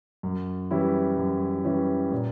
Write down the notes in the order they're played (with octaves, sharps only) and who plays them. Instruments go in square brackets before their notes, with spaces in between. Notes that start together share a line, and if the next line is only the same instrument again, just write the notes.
[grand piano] F#2
E3 G3 C#4 E4
F#2
E3 G3 C#4 E4
A#2